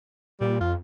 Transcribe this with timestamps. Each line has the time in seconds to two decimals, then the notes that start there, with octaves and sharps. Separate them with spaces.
0.41 A#2 G3
0.61 F2 F4